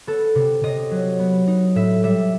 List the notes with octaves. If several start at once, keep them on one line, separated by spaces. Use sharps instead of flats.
B3 A4
C3
C3 D#5
F#3
B3
D#4
A2 E5
G3 E5